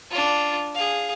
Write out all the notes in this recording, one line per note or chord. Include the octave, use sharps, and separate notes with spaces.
D4 F4
G#4 F5